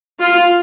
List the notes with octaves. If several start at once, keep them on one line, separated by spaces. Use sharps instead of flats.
F4